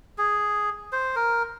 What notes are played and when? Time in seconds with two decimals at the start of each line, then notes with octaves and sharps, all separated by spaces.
0.18 G#4
0.92 C5
1.16 A#4